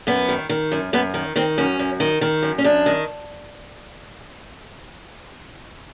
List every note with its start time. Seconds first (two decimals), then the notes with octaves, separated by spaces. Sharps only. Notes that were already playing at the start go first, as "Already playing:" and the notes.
0.07 F#2 B3
0.28 D#3
0.49 D#3
0.72 F#2
0.93 F#2 B3
1.14 D#3
1.36 D#3 C4
1.58 F#2 C#4
1.79 F#2
2.00 D#3
2.21 D#3
2.42 F#2
2.58 C#4
2.64 F#2 D4
2.86 D#3